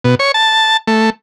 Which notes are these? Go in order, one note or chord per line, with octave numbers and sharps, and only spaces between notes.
B2
C#5
A5
A3